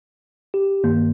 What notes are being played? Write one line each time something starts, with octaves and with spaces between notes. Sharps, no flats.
G4
G2 D#3 A#3